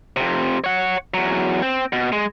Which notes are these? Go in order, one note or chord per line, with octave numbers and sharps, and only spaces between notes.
F2 C3
C#5 F#5
E2 F#3
C4
B2
G#3